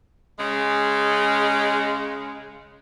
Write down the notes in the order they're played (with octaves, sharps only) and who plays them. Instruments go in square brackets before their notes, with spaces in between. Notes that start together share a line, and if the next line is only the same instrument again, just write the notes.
[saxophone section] C#3 G#3